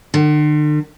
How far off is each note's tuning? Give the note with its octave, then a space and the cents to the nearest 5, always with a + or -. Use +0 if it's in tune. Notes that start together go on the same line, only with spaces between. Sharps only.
D3 +45